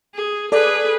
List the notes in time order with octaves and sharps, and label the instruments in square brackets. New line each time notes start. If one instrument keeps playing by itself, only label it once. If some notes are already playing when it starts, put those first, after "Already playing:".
[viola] G#4
[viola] G#4 B4 [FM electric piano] A4 D5